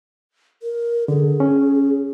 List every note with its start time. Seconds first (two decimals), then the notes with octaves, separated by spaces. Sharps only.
0.63 A#4
1.08 D3 G#4
1.40 C#4